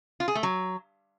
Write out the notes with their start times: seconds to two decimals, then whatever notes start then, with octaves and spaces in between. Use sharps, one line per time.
0.20 F4
0.28 G#4
0.35 A3
0.43 F#3